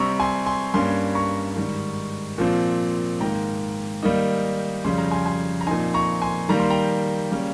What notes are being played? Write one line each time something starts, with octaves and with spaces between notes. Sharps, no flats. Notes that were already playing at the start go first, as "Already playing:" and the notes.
Already playing: C3 G3 C4 A#5 C#6
G#5 C6
G#5 C6
G2 G3 A#3 C#4 G#5 C6
A#5 C#6
G#2 D#3 G3
A#2 F3 C4
G#2 D#3 A#3 G5 A#5
D#3 G3 A#3 D#4
F2 C#3 G3 C#4 C6
A#5
G#5 C6
G#5 C6
A#5
A#2 F3 C4 D#4 G#5 C6
A#5 C#6
G#5 C6
D#3 G3 A#3 A#5
C6
G5 A#5
C#3 G3 A#3 C#4